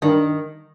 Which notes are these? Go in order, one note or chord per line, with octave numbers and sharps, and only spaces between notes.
G2 D#3